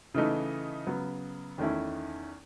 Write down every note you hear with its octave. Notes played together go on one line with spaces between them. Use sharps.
C#3 E3 A3 D#4
C#3 F#3 B3
E2 D#3 A3 C#4 E4